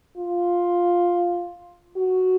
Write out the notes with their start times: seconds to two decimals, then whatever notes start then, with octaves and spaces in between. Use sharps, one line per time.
0.17 F4
1.97 F#4